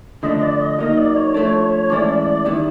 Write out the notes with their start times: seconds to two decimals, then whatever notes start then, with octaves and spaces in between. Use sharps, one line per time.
0.23 D3 F3 A3 D4 D#5
0.41 D5
0.61 D#5
0.79 F#3 A#3 D#4 D#5
0.97 D5
1.16 C#5
1.34 F3 A3 D4
1.90 A2 E3 G#3 C#4 E4 D5
2.09 D5
2.26 D5
2.45 D#3 G3 B3 E4